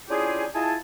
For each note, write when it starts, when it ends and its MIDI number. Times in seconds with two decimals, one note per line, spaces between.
0.09 0.46 61
0.09 0.46 62
0.09 0.46 64
0.09 0.46 65
0.09 0.46 67
0.09 0.46 68
0.54 0.74 64
0.54 0.74 65
0.54 0.74 68
0.54 0.74 75
0.54 0.74 80
0.54 0.74 81